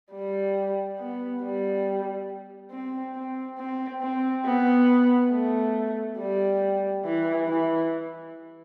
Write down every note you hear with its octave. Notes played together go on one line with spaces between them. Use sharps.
G3
B3
G3
C4
C4
C4
C4
B3
A3
G3
E3
E3